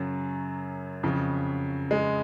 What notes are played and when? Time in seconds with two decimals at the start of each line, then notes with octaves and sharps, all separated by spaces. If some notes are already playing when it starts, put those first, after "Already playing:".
Already playing: F#2 C#3 F#3
1.03 F2 C#3
1.91 G#3